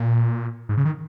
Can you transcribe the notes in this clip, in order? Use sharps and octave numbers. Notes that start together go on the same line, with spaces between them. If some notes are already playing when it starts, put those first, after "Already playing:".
Already playing: A#2
G#2
C#3
D#3